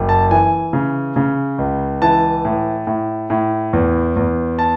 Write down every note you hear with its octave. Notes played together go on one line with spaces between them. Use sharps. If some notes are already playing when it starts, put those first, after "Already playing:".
Already playing: F#1
A5
E3 G#5
C#3
C#3
C#2
E3 A5
A2
A2
A2
E2
E2
A5